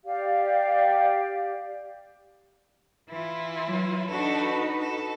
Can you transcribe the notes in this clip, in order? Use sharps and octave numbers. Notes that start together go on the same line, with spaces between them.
G4 D5 F5
E3 E4 F4
F#3
D4 D#4 F#4 A4 B4
A4